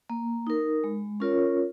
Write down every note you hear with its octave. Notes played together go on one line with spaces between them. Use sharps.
A#3
D#4 A#4
G#3
C#4 F4 A#4 C#5